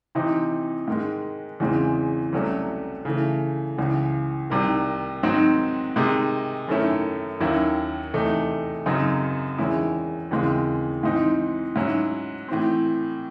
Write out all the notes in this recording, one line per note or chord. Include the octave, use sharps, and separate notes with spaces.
C3 E3 C4 D#4
G#2 D#3 G#3
E2 C#3 E3 G#3 C4
C2 C3 F#3 A3 C#4
C#3 E3 A3
C#2 C#3 E3
C2 C3 D#3
G#2 D#3 F#3 C4 D#4
C3 D#3 G#3 D#4
F#2 D#3 A3 C#4 E4
D#2 D#3 F#3 C#4 E4
E2 C3 E3 A3 D#4
F#2 C#3 F#3 C4 D#4
E2 D#3 G#3 C#4 E4
D#2 C#3 E3 G#3 C4
G#2 E3 C4 D#4
G#2 F#3 C#4 E4
A2 E3 C4